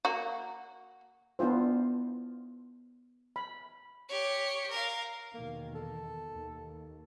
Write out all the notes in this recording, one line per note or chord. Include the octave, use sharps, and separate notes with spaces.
A#3 F#4
B3 D4 E4 F4 C5
B5
G4 C#5
A#4 F5
E2 B2 D#3 A#3
A4
D#2